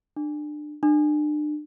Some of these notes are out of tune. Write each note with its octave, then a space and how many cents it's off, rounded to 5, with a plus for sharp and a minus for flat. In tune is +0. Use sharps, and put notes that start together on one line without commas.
D4 +25
D4 +40